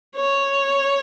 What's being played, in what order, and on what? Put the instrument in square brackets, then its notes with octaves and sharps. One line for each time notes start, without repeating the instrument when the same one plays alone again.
[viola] C#5